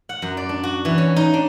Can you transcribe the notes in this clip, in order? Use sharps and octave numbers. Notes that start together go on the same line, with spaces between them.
F#5
F#2
D5
D4
F#4
E3
C#4
D#4
D4